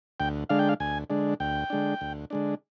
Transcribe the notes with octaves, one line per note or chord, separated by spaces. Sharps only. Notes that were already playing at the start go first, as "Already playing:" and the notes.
D2 G5
D3 G#3 D4 F5
G5
F5
D2 G#5
D3 G#3 D4
D2 G5
D3 G#3 D4
D2
D3 G#3 D4